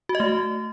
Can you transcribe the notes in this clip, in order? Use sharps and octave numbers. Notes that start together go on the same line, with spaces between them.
F#4
D#5
A3